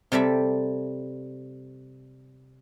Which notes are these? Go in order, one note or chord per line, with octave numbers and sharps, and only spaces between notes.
C3 G3 A4 D5 E5